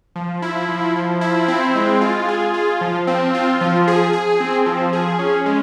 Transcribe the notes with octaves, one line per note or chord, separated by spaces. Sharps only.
F3
E4
F3
F3
E4
C4
G#3
F4
G#4
F4
F3
C4
F4
F3
G#4
G#4
C4
F3
G#4
C#4
G#3